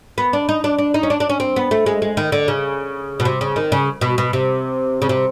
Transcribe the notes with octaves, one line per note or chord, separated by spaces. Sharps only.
B3
D4
D#4
D4
D4
D#4
C#4
D4
D4
C#4
C4
B3
A3
G#3
G#3
D#3
D3
C#3
B2
C3
C#3
D#3
C#3
B2
B2
C3
C#3
C3